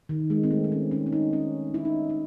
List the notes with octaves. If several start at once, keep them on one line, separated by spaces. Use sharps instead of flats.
D#3
G#3
C4
A3
C4
C#4
C#4
C#4
D#4
C#4
E4
D#4
D#4